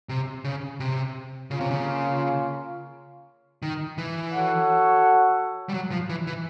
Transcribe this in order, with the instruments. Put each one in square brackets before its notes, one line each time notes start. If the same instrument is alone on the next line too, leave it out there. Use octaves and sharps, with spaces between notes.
[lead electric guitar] C3
C#3
C3
[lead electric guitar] C#3 [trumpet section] A#3 C#4 F4
[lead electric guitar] C3
C#3
D#3
E3
[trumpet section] F#4 A4 C#5 F#5
[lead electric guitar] G3
F#3
F3
E3
E3